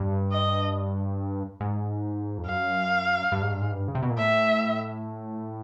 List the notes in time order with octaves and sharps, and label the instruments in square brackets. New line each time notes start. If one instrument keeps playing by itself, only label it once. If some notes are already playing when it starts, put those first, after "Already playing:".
Already playing: [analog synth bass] G2
[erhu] D#5
[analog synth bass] G#2
F2
[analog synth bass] F#2 [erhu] F5
[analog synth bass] G2
G#2
G2
G#2
G2
C#3
C3
B2
A#2
[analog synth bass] A2 [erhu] E5